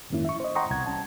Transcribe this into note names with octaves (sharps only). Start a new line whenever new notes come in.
F2 G#2 D#3 A#3 C#4 E4
E5 C#6
C5 D#5
F#5 G5 A#5 C6 C#6 D#6
C2 B2 F#5 G#6
G3 C#4 A5